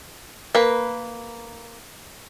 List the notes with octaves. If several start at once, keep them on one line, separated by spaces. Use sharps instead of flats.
A#3 B4